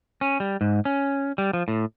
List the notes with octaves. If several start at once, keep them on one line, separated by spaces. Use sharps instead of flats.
C#4
G3
G#2
C#4
G3
F3
A2